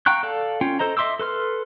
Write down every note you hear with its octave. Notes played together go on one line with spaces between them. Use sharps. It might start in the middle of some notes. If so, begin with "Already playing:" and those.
F5 G5 A#5 C#6 F#6
A4 D5 F5 A5
C#4 F4 G5
A4 C5 D#5 A#5
D#5 E5 C6 D6 E6
A4 B4 C6 F6